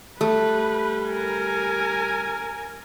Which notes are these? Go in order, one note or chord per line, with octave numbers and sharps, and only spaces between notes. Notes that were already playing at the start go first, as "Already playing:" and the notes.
G3 A3 B4
A#4 G#5